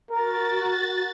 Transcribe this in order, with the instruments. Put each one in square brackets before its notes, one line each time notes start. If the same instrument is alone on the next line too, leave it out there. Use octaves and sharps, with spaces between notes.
[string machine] F#4 A6 [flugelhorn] A#4